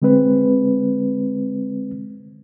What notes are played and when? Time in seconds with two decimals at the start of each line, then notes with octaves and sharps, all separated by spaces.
0.02 D3 G#3 C4 B4